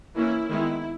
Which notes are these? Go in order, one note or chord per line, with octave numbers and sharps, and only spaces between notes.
E3 A#3 C#4 E4
D#3 G#3 B3 E4